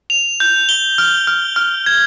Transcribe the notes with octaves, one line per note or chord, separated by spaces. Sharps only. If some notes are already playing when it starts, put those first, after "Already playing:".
F7
G6
G7
F6
F6
F6
G#6